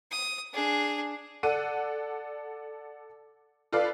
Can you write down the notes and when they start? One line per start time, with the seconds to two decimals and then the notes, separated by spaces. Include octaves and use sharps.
0.12 D#6
0.54 D4 G#4
1.43 A4 D5 F#5 D#7
3.72 F4 A4 B4 D5 F5